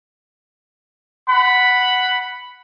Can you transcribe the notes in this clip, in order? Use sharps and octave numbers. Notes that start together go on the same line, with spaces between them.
F#5 B5